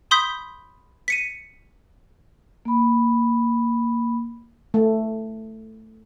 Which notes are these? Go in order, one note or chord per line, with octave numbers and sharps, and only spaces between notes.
B5 C6 D#6 G6 B6
B6 C#7 D#7
A#3 B5
A3